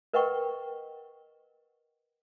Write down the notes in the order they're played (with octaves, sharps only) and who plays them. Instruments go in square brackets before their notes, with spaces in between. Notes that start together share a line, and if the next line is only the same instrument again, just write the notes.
[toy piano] A#4 B4 D#5 F#5 G5 C#6